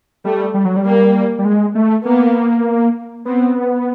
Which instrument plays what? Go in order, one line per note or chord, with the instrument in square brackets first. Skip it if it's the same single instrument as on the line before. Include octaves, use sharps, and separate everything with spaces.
[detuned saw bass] G3 [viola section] A3
[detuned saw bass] G3
F#3
G3
[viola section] A#3
[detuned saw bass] G3
G#3
A3
[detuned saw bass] A#3 [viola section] B3
[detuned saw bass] B3 [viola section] C4